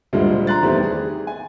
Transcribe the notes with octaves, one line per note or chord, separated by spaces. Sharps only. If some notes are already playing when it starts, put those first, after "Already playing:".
D2 G2 A#2 F3 G#3
A#5 C6 F#6 A6
E2 D#3 G3 A3 C4
G4 G#4
G#5